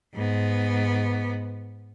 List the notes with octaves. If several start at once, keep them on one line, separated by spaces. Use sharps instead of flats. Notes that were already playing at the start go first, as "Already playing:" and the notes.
G#2 B3